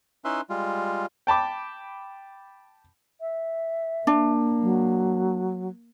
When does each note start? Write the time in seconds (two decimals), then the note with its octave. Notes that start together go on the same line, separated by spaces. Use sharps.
0.25 C#4 D#4 E4 B4 E5 C6
0.50 G3 G#3 F4
1.27 G5 A5 B5 D6
3.21 E5
4.07 A#3 D4
4.62 F#3